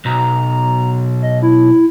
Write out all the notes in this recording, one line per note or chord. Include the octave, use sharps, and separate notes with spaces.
B1 A#5
D#5
E4